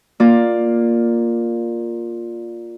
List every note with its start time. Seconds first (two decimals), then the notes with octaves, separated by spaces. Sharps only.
0.20 A#3 F4 D5